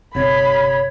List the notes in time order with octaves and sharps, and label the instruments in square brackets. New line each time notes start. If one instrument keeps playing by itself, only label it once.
[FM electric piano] G1 C3 [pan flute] C#5 [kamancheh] B5